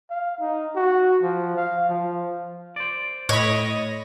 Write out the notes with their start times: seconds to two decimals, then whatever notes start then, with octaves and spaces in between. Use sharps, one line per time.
0.10 F5
0.40 D#4
0.76 F#4
1.23 F3
1.57 F5
1.89 F3
2.76 C5 D5
3.29 A2 C#5 D#5 B5